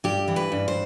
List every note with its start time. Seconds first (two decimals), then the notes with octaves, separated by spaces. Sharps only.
0.04 G2 G4
0.28 E3
0.36 B4
0.52 G2
0.68 C5